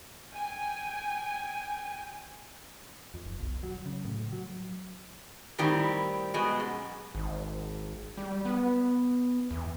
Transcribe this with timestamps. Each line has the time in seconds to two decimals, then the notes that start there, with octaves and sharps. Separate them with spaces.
0.32 G5 G#5
3.14 F2
3.26 F1
3.40 B1
3.63 F#3
3.86 C#3
4.05 A2
4.32 F#3
5.58 A2 D#3 G3 C4 E4
6.34 B2 G#3
6.60 F#2
7.15 G#1
8.17 G3
8.45 B3
9.51 E2